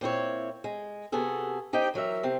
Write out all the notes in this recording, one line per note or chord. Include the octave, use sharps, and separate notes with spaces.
A#2 C4 E4 C#5
G#3
C3 B3 F#4 G#4 A4
D#4 G4 C5 D#5 G5
E3 F#3 A#4 E5
C3 C4